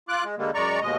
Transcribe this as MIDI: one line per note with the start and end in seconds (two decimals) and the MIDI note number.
0.08 0.24 65
0.08 0.24 86
0.08 0.24 90
0.24 0.35 56
0.38 0.51 50
0.38 0.51 55
0.38 0.51 56
0.38 0.51 58
0.54 0.80 42
0.54 0.80 56
0.54 0.80 74
0.54 0.80 82
0.54 0.80 85
0.82 0.97 39
0.82 0.97 47
0.82 0.97 56
0.82 0.97 75